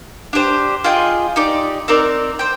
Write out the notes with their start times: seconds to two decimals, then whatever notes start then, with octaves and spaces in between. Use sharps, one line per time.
0.33 D4 G4 C5
0.84 F4 G#4 D#5 G5
1.36 D#4 G4 D5
1.88 C4 D#4 A#4 D5
2.39 C5 G5